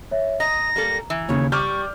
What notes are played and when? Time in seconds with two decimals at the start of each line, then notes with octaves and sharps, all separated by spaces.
0.11 C#5 E5
0.40 D#5 A#5 A#6
0.76 G3 A#3 A4
1.10 E3
1.28 D#2 C#3 C#5
1.52 G3 C#6 D6 F6 G6